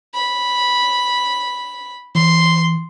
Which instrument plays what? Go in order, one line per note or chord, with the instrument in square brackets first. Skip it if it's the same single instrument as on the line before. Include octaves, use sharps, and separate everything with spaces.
[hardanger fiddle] B5
[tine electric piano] E3 [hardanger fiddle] C6